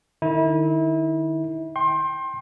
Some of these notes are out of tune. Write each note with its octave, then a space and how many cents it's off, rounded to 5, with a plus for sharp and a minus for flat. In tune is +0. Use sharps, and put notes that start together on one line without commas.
D#3 -35 E4 -30
G5 +0 C6 +30